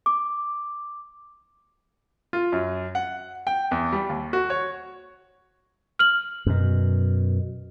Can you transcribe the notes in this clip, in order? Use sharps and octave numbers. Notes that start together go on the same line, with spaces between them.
D6
F4
F#2
F#5
G5
E2
G3
D#2
F#4
C#5
F6 F#7
F#2 B2